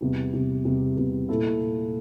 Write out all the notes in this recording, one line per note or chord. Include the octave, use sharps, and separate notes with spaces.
E2 C3 G3
E2 C3 G3
E2 C3 G3
E2 C3 G3
A#2 A3 E4 A4